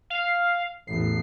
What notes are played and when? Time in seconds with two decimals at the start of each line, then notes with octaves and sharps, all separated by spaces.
0.10 F5
0.87 A1 E2 C7